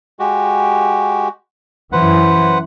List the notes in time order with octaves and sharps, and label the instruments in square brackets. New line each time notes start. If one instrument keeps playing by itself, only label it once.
[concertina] G#3 F#4 G4
[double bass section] F#2 E3 [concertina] B4 C5 F#5